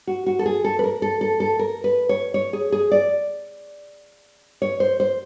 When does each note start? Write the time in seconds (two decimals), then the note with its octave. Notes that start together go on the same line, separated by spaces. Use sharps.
0.07 F#4
0.26 F#4
0.39 A4
0.46 G#4
0.64 A4
0.79 B4
0.84 A#4
1.02 A4
1.21 A4
1.40 A4
1.59 A#4
1.84 B4
2.09 C#5
2.34 C#5
2.53 G#4
2.72 G#4
2.91 D5
4.62 C#5
4.80 C5
5.00 C5